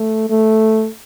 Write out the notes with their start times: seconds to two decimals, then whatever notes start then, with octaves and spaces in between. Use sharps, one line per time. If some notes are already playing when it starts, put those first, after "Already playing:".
Already playing: A3
0.30 A3